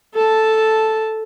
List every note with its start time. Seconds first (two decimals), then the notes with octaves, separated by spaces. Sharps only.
0.14 A4 A5